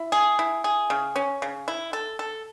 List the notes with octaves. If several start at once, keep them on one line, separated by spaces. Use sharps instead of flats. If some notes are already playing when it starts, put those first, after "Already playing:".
Already playing: E4
G#4
E4
G#4
C#3
C#4
C#3
E4
A4
A4